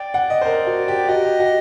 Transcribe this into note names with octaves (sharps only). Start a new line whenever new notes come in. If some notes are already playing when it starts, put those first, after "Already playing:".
Already playing: D5 G5
F#5
D#5
C5
A#4
F#4
G4
F#4 D#5
G4
F#4